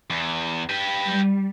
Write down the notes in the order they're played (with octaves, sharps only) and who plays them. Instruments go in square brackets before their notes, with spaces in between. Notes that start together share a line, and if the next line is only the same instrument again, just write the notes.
[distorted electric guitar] E2
G4 B4
[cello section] G3